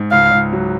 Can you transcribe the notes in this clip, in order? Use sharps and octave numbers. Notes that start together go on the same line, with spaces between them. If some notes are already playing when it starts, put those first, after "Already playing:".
Already playing: G#2
C#2 F5
C#2
F#3